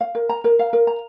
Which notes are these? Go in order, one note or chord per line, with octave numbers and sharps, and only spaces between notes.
F5
A#4
A#5
A#4
F5
A#4
A#5